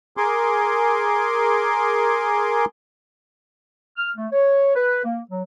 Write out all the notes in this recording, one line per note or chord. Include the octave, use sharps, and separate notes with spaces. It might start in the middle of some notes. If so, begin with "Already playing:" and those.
G#4 A#4 G#5 C6 D6
F6
A3
C#5
B4
A#3
F#3